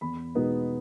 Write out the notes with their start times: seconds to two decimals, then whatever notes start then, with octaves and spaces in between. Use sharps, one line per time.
0.01 E2 B5
0.35 B2 G#3 B3 D#4